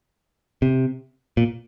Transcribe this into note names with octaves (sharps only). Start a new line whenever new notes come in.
C3
A#2